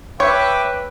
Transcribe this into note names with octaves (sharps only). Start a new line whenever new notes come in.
B4 C#5 E5 G5 D6